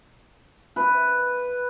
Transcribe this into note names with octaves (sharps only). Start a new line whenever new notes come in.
B4